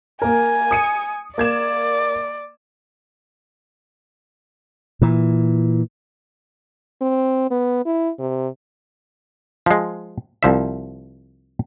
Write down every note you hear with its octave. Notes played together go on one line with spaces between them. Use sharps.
A#3 A#4 G#5
D#6 C#7 D#7
A#3 D5 G#6 E7
A#2 E3
C4
B3
E4
C3
F3 G#3
C2 F3 E5